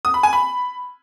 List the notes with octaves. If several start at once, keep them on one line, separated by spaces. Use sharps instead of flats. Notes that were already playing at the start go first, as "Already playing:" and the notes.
D#6
B5
G#5
B5